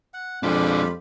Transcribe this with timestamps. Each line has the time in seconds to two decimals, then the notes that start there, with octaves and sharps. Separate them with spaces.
0.14 F#5
0.43 F2 G#3 D4 F4 G4 B5